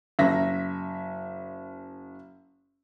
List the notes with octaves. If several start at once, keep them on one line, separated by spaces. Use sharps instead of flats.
F#1 E5 A#6